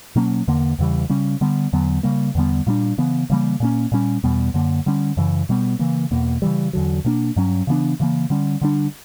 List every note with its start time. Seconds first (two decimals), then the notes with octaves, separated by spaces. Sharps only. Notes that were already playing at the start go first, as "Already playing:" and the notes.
0.16 B2 F#3 A#3 C#4
0.48 E2 D3 A#3
0.79 E2 C#3 E3 G3
1.10 C#3 G3 C#4
1.41 D3 G3 B3
1.73 E2 D3 F#3 B3
2.03 C#3 G3 A#3
2.35 E2 D3 G3 B3
2.67 A#2 G3 A#3 D4
2.98 C#3 E3 B3
3.30 C#3 E3 G3 A#3
3.60 A#2 A#3 C#4
3.92 A#2 G3 C#4
4.24 E2 B2 G3 B3
4.54 F#2 D3 A#3
4.86 D3 G3 C#4
5.17 F#2 C#3 E3
5.49 B2 G3 B3
5.79 C#3 E3 A#3
6.11 E2 B2 A#3
6.42 C#3 E3 G3
6.73 E2 D3 F#3
7.05 B2 A#3 D4
7.36 G2 F#3 C#4
7.67 C#3 E3 B3 D4
8.00 C#3 E3 A#3
8.30 D3 G3 C#4
8.61 D3 G3 B3 D4